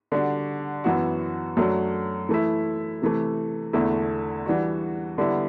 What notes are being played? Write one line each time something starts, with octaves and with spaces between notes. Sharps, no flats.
D3 G3 D4 F#4
F#2 E3 B3 F#4
F#2 F#3 A3 D4
E3 A3 E4
C3 E3 A3
E2 D3 A3 E4
E3 G3 D4 F#4
D3 G3 B3 E4